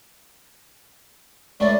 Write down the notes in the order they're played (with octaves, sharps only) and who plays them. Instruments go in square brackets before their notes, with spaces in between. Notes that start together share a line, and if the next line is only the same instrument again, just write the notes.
[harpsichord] C#2 C#3 A3 [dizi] D5